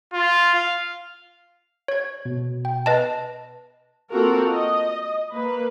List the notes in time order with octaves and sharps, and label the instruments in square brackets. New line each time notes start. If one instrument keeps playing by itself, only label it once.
[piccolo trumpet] F4
F5
[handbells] C#5 G#6
[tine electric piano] B2
[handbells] G5
B4 D#5 A5
[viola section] A#3 C4 F4 F#4 A4 A#4
D#5
A#3 B4